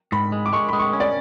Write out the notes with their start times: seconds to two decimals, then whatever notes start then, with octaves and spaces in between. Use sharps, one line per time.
0.12 G#2 B5
0.32 G#3
0.46 D6
0.52 G#3 C#6
0.69 G#3 B5
0.79 C#6
0.93 C#4
1.00 D5